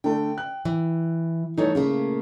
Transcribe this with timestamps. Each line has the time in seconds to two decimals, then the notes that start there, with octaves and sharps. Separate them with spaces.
0.04 D3 A3 G5
0.38 F#6
0.65 E3
1.58 G2 E3 A3 D#4 A4 C#5
1.75 A#2 C#3 A3 A#3